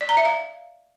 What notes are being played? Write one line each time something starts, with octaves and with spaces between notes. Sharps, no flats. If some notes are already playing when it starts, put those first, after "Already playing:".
D5
A#5
E5
F5